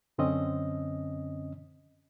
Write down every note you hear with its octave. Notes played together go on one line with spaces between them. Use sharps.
F#2 D3 C4 C#4 D#5